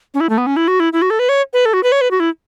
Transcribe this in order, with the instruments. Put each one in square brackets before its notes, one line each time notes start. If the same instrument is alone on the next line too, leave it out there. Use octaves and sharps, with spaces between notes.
[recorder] C#4
E4
A3
B3
C#4
E4
F#4
E4
E4
F#4
A4
B4
C#5
B4
A4
F#4
B4
C#5
B4
F#4
E4